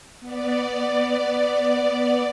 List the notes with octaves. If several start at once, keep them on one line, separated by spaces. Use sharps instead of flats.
B3 D5